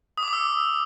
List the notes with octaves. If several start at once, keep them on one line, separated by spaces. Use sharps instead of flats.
D#6
D6
D#6
E6